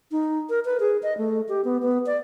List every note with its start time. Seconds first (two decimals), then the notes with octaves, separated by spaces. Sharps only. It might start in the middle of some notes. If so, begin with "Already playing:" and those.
0.11 D#4
0.49 A#4
0.65 B4
0.80 G#4
1.03 D#5
1.18 A3
1.49 G4
1.64 B3
1.82 B3
2.06 D5